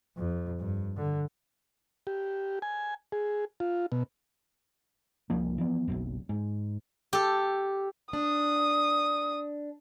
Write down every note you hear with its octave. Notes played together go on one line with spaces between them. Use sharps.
F2
G2
D3
G4
G#5
G#4
F4
B2
C2 F3 A#3
E3 F3 B3
F#1 B1 F#2
G#2
G4 A4
D4 D#6